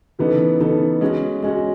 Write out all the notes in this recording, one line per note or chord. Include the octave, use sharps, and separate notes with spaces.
C#3 E3 B3 D#4 A4
C#3 E3 B3 D#4 A4
G#3 C#4 F#4
G#3 C#4 F#4